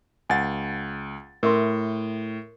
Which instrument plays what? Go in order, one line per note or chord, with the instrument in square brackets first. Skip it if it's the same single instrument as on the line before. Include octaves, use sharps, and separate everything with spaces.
[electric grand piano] C#2 A6 [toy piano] F#5 G#5
[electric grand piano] A2 [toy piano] A#4 E5 C6